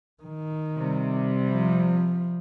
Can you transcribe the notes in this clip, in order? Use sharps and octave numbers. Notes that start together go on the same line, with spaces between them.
D#3
C3 G3
F3